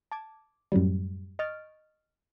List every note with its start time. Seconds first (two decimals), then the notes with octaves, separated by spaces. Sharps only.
0.12 A5 D6 G#6
0.72 F#2 A2 F#3 G3
1.39 D#5 C#6 F6 G6 A6 D7